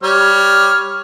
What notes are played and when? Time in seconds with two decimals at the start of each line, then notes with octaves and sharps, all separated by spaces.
0.03 G3 C#5 F6